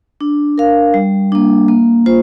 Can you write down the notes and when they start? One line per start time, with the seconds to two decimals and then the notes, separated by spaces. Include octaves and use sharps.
0.21 D4
0.58 A#4 F5
0.94 G3
1.32 A#3 D4
1.68 A#3
2.06 F4 C5